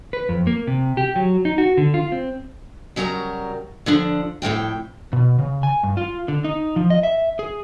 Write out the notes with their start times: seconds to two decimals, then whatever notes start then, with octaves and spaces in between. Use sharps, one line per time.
0.13 B4
0.29 F2
0.47 A#3
0.67 C3
0.97 G4
1.16 F#3
1.45 D#4
1.58 F#4
1.77 D3
1.94 F4
2.12 C4
2.96 C#3 F#3 G3 A#4 A#5
3.86 D3 F3 D4
4.42 F2 A2 F3 G5
5.13 B2
5.39 C#3
5.63 G#5
5.83 G2
5.97 F4
6.28 D3
6.44 D#4
6.76 F3
6.90 D#5
7.03 E5
7.39 G#4